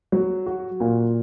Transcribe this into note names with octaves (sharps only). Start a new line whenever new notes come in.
F#3
F#4
A#2